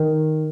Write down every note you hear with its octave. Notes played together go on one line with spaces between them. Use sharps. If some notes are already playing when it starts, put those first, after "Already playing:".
Already playing: D#3